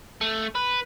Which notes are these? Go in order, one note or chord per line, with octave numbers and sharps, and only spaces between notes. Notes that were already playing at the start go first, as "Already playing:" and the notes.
A3
B4